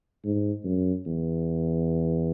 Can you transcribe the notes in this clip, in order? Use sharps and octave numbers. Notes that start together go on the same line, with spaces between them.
G#2
F#2
E2